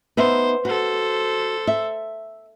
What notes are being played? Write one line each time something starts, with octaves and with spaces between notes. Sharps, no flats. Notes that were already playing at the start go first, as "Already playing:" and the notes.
B3 D#4 C5 E5
F#4 A4 C5
E5